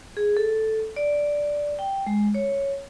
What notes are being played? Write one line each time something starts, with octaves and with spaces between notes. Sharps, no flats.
G#4
A4
D5
G5
G#3
C#5